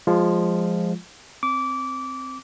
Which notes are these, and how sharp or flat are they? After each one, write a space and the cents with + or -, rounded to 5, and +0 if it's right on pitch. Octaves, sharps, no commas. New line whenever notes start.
F3 +0 G#3 -15 F4 +0
C4 +0 D6 -20